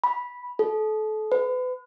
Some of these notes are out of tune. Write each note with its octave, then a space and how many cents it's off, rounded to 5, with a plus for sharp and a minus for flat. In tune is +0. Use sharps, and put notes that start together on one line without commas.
B5 -10
A4 -30
B4 +35